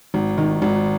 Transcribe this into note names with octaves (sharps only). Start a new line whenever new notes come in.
G#1
D#3
G#1